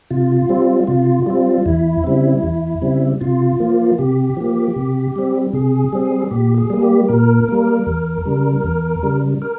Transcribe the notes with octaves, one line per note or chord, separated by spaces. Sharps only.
C3 F4
G3 C4
C3 F4
G3 C4 F4
E2 E4
C#3 G3 C4
E2
C#3 G3 C4
C3 F4
F3 A#3
C3 G4
F3 A#3
C3
G3 C4
C3 G#4
G3 C4
A#2 G4
G#4
G3 A#3
G4
A#2 A#4
G3 A#3
E2
C#3 G3
E2
C#3 G3
A#4